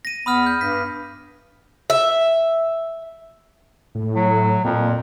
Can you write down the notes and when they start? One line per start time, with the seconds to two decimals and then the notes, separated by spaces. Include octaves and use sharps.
0.05 A#6 D#7
0.26 E2 B3 B5 D#6 F6
0.46 G6
0.61 G2 B6
1.90 E5
3.95 A2
4.15 F#3
4.64 F2 A#2